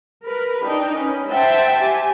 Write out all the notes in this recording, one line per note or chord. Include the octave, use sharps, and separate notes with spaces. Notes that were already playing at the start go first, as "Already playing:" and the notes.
A#4 B4
D4 D#4 G5
C#4 B4
C5 E5 F#5 G5 A5
G4 G#5